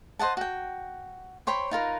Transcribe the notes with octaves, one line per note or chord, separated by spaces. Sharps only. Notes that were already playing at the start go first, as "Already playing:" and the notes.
C5 D#5 F#5 A5
F#4 G5
C5 C#5 G5 B5
D#4 F4 A#4 B4